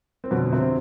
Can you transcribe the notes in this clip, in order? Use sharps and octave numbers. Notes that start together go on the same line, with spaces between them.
C4
F2 B2 D3 F#3 B3
C3 C4